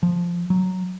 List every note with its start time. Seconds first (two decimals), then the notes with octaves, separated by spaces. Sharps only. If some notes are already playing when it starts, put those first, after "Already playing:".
0.03 F3
0.50 F#3